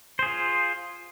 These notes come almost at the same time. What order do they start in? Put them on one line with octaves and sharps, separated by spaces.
C5 G#4 F4